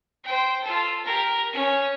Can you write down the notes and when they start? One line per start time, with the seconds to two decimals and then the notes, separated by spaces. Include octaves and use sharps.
0.24 C5 G5
0.64 F4 A4
1.04 G4 A#4
1.53 C#4 C#5